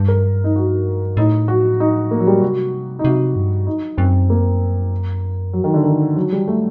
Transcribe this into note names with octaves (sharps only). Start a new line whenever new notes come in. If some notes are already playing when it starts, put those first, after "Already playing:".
Already playing: G2
A#4
D#4
F#4
A2 D#4
F#4
D#4
A#3
F#3
G3
C3 F#4
D#4
C3 F#4
G2
D#4
F#2 C4
A#3
F#3
D#3
D3
D#3
F#3
G3
A3